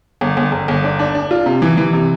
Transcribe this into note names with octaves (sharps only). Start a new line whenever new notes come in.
G1
G1
G1
G1
D4
D4
D4
F4
C3
E3
E3
C3